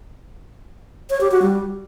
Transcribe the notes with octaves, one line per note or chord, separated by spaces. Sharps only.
C#5
G4
F#4
G3